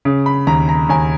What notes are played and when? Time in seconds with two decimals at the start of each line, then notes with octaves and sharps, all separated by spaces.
0.05 C#3
0.26 B5
0.47 D#2 A#5
0.69 A#5
0.89 D#2 G#5